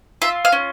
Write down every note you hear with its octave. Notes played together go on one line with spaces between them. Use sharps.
F4 E5
F5
C#4